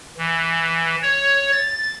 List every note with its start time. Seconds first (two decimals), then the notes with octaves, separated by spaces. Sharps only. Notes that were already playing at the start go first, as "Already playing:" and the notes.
0.18 E3
1.02 C#5
1.52 A6